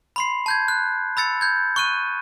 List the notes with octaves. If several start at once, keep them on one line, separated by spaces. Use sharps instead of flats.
B5 C6 C7
A5 G6 G#6
F#6
B5 E6 A6 C#7
G6 G#6
C#6 F#6 D#7